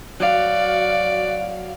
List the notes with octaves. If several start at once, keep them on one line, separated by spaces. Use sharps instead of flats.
F#3 F#4 D5 F5